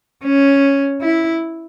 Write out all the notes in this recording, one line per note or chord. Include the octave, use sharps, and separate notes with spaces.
C#4
E4